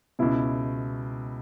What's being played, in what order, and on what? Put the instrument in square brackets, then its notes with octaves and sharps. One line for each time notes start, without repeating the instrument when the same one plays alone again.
[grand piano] C#2 B2 E4